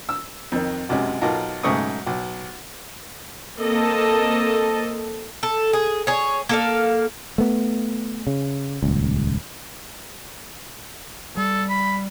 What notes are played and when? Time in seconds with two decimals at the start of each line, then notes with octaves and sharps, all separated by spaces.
0.09 E6
0.52 F2 D#3
0.89 B1 F#2 C3 G#3
1.21 B1 D#4 F4 A4 A#4
1.63 B1 G#2 C#3 A3 C#6 D#6
2.06 B1
3.58 A#3 C4 A4 D#5 A5
5.43 A4
5.73 G#4
6.07 G#4 C#5
6.49 A#3 A4 F5
7.38 A3 B3
8.27 C#3
8.83 D#1 C#2
11.37 G3 A4
11.69 B5